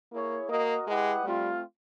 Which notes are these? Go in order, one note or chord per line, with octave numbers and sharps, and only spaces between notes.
A#3 E4 G#4 C#5
A#3 F#4 A#4 D#5
G#3 E4 G4 B4 D#5 F#5
G3 A3 C4 F4